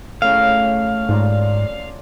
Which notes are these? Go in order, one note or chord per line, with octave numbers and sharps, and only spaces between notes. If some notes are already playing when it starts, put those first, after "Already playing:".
A2 C#3 F5
G#2 F4 D5 A#5